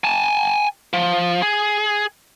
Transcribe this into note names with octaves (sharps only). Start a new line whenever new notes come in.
G#5 A5
F3
G#4